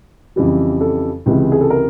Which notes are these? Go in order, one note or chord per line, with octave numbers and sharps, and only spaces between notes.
F2 C#3 E3 G3
A4
C#2 C3 E3 G#3
G#4
A4
A#4